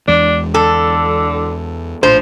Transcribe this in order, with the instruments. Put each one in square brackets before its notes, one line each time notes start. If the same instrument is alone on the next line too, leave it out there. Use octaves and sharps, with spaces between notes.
[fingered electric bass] E2 E3 G#3 [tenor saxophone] D4
[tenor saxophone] D3 [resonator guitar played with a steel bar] A4
[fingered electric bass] A#1 A2 D4 [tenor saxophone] F3 [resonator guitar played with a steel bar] C5